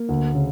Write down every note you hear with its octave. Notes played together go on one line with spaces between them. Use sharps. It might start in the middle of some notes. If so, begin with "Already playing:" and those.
Already playing: A#3
D2
C#3